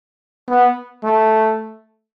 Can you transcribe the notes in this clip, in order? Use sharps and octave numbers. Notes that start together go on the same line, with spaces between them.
B3
A3